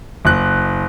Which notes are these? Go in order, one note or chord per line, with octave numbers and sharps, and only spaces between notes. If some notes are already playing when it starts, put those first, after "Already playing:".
F#1 F#6